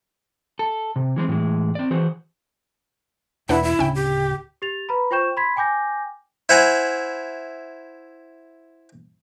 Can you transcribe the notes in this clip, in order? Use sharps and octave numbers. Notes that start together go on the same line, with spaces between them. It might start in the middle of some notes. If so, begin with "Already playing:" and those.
A4
C3
E3 G#3 C4
A2 D3 E3 G#3
C4 D5
E3 F#4 G#4 C5
E2 B2 A#3 D4 E4 B4 F#5
E4
D1 C#3 C#4 D4 G5
G4
G4 A6 F7
B4 A#5 B5
F4 C5 G5 C#6 G6 E7
B5 C6 G#6 B6
G5 G#5 D6 G6 A#6
E4 C5 F#5 G#5 A#5